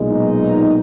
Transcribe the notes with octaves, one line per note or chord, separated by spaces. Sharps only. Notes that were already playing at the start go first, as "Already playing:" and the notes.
Already playing: B1 A#2 G#3
D#4